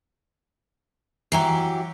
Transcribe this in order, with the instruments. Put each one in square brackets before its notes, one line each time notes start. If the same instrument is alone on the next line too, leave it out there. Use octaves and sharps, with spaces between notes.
[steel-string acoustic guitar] E3 F#3 G4 [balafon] E5 G#5 A#5